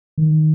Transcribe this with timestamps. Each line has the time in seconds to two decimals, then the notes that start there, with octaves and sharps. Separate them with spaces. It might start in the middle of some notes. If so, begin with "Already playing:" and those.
0.18 D#3